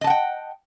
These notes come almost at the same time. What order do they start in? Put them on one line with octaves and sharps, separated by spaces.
D#5 A5 F#5 G5